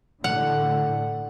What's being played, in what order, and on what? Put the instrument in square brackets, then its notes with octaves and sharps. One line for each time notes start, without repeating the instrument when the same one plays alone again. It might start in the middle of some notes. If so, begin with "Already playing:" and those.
[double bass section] A2 D3 A3 [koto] F#5